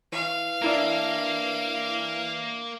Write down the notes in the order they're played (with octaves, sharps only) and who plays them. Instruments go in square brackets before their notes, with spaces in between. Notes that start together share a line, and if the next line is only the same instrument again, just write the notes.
[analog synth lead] E3 [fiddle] F5
[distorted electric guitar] A#3 [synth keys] D4 E4 A#4